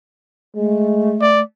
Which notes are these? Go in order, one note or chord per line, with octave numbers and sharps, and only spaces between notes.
G#3 A3
D5